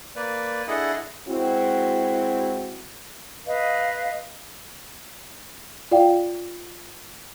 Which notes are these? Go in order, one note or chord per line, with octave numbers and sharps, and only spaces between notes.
A#3 B4 D5
D4 E4 G#4 A4 D#5 F#5
G#3 C4 E4 F#4
B4 D#5 F5
F4 D5 F5 G5